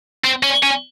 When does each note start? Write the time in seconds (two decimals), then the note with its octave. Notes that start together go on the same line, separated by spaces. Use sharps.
0.24 C4
0.43 C#4
0.63 C#4